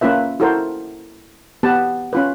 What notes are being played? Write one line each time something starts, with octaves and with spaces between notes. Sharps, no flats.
A#3 C#4 F4 B4 E5
E4 F#4 A4 A#4 C5
B3 G4 B4 A5
C#4 F4 B4